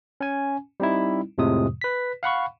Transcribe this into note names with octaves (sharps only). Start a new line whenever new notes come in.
C#4 G#5
G3 C4 D#4 E4
F2 A2 C3 F3 G#3 D#6
B4 B6
F5 F#5 B5 C#6